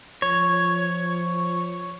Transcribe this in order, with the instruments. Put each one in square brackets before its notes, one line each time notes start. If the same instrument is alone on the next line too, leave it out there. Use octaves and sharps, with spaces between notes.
[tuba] F3 [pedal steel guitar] C#5